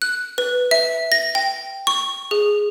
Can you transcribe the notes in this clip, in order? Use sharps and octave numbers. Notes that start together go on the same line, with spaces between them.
F#6
B4
E5
A#6
G5
C#6
G#4